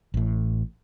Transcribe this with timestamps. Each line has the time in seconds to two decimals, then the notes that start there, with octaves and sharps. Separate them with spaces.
0.14 A1 A2